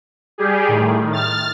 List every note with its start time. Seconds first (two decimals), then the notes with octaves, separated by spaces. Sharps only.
0.38 G3 G4 G#4
0.68 A2 D#3
1.13 F6 A6